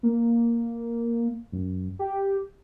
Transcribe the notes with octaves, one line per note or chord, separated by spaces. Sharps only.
A#3
F#2
G4